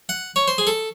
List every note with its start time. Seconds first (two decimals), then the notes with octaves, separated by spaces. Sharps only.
0.09 F#5
0.36 C#5
0.48 C5
0.58 G#4
0.67 A4